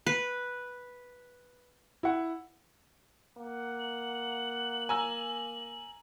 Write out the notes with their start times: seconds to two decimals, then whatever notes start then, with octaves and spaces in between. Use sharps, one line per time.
0.07 B4
2.03 E4 F#5
3.38 A#3 F#5
3.79 F#7
4.89 G#5 A#5 E6